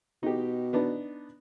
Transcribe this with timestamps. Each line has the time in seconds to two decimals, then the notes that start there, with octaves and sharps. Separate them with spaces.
0.23 B2 D#4 G4
0.73 B3 D4 D#4